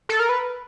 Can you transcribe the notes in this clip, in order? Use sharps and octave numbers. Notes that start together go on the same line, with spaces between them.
A4
A#4
B4